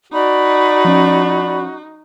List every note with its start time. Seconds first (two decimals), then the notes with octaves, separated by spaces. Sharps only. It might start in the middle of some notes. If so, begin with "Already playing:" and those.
0.12 D#4 F#4 D5 B5
0.85 F3 C#4